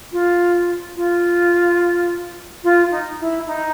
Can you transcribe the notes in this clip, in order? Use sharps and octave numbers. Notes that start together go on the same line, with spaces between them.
F4
F4
F4
D#4
E4
D#4